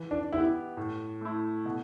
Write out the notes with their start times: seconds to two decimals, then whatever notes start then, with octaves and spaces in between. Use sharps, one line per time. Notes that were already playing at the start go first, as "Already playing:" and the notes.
Already playing: E3
0.11 D4
0.33 B3 E4 G4
0.77 A2
1.21 A3 E4
1.65 B2